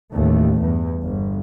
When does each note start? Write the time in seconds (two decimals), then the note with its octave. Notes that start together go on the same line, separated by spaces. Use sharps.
0.13 A1 D#2 A3
0.62 E2 G2
1.03 G1